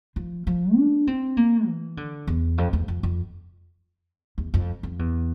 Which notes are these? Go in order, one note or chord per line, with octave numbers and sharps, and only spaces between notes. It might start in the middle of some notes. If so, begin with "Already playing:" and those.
F3
F3
D4
C4
A#3
E3
D3
E2
F2
E2
F2
F2
E2
F2
F2
E2